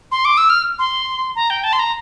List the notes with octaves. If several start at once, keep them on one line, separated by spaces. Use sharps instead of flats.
C6
D6
E6
F6
C6
A#5
G5
A5
C6
A#5